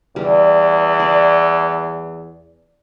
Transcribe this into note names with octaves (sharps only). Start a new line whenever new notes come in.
E2 G3
D5